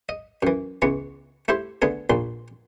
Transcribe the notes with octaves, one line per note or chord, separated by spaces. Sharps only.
D#5
F#2 E3
C#2 E3 B3 C#6
A3 E4 G4 C5
D3 A3 B3 G#4
A#1 A#2 C6